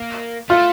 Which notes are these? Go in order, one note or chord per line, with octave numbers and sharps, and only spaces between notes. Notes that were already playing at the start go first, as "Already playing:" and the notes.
Already playing: A#3
A3 F4